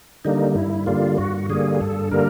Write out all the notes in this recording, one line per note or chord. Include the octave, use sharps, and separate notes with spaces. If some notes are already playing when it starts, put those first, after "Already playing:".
D3 G3 A#3 D#4
G2 E4
D3 G3 A#3 F4
G2 F#4
D3 G3 A#3 G#4
G#4
G2 A4
D3 G3 A#3 A#4